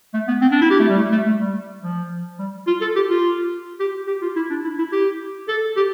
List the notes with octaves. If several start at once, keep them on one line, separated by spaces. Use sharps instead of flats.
A3
B3
C4
D4
E4
G4
A3
G3
A3
A3
A3
G3
F3
G3
F4
A4
G4
F4
G4
G4
F4
E4
D4
E4
E4
G4
A4
G4